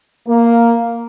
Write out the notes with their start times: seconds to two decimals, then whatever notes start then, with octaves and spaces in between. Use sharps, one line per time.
0.27 A#3